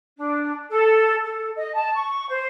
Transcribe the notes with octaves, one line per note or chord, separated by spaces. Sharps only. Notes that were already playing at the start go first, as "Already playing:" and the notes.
D4
A4
A4
D#5
A5
C#6
C5